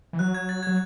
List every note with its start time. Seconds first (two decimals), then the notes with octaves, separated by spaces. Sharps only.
0.13 E3
0.19 F#3 F#6
0.35 G#6
0.49 A6
0.63 F#3 G#6